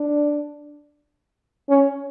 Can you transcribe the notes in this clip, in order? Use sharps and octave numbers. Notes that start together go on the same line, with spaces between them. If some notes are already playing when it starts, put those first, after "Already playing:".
Already playing: D4
C#4